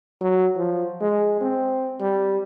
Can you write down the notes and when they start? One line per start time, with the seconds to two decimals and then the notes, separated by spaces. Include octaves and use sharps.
0.21 F#3
0.57 F3
1.01 G#3
1.41 C4
2.00 G3